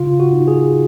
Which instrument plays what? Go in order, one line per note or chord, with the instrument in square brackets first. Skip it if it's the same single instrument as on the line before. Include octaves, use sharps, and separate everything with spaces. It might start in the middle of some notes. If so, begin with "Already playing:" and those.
Already playing: [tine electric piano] C#3 F4
F#4
D#4
G#4